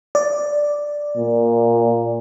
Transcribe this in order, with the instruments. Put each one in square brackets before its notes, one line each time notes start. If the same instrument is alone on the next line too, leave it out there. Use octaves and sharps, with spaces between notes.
[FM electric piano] D5
[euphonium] A#2